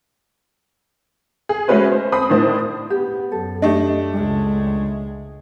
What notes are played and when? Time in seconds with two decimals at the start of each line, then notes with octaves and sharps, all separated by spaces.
1.49 G#4
1.68 G#3 A3 C#4 F#4 B4 C5
1.92 C5
2.12 C4 B5 D#6
2.30 A2 D#3 D4 C5
2.90 B3 G4
3.32 F#2 A4
3.62 A3 D4 G4 D#5
4.13 C#2 G#3